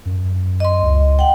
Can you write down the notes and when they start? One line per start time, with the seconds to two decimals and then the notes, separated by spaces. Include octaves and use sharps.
0.05 F#2
0.60 D#5 C6
0.83 C#2
1.19 F#5 G5